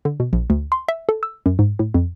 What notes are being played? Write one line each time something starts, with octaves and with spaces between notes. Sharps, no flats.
D3
B2
A#1
D2
C6
E5
A4
E6
F#2
G#2
A2
F2